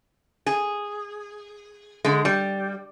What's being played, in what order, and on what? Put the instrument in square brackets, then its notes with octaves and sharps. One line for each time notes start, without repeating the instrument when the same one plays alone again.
[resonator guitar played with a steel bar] G#4
D3 G#3
G3